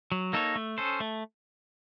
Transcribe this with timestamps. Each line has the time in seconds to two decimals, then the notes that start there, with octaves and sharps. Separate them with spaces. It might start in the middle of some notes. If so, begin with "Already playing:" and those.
0.12 F#3
0.33 A#3 D#4 A4 C#5
0.56 A3
0.78 C#4 A4 C5
1.00 A3